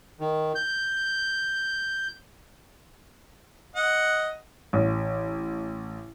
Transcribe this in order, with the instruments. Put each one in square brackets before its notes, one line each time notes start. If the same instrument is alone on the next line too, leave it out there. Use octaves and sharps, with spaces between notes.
[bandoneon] D#3
G6
[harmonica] D#5 F#5
[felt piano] A1